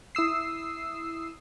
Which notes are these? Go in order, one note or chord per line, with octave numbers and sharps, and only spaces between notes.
E4 D#6 E6 C7